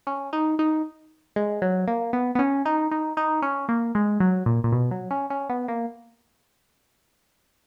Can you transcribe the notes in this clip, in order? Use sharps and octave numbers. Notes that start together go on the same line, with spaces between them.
C#4
D#4
D#4
G#3
F#3
A#3
B3
B3
C#4
D#4
D#4
D#4
C#4
A#3
G#3
F#3
A#2
A#2
B2
F#3
C#4
C#4
B3
A#3